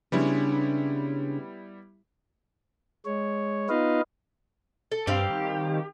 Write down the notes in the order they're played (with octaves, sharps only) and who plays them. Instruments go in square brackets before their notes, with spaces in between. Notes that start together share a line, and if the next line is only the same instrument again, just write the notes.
[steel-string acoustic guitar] C#3 G#3 C#5 [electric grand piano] G3 B3 E4 [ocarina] D4
[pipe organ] G#3 C#5
B3 D#4 F4 B4 D#5 F5
[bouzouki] A4
[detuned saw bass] G2 [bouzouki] G3 C4 F5 [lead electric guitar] G4
[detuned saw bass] D#3